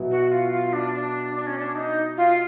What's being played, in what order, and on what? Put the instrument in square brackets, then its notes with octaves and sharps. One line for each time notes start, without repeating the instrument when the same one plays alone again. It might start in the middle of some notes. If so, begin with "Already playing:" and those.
Already playing: [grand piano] B2 F#3 B3 E4
[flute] F#4
F4
F4
D4
D4
D4
C#4
D4
D#4
F4